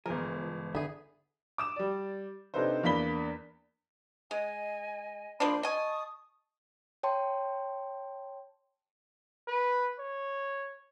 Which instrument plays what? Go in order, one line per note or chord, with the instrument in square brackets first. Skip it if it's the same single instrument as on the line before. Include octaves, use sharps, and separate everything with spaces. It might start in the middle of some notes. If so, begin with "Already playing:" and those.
[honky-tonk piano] G1 F3 [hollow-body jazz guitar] C#2 E3 G#4 [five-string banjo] A#4
[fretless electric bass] D3 [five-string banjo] B3 G#4 [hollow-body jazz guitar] E5
[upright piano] D6 D#6 E7
G3 D5
C3 D4 D#4 A4 B4 C5
E2 A#3 D4 B5 B6 G7
[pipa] G#3 [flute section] D#5 G#5
[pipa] F3 A#3 D4 [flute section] C5 B5 C6
[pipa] D#5 G#5 [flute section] A5 C#6 D#6
[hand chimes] C#5 G5 A5 C6
[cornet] B4
C#5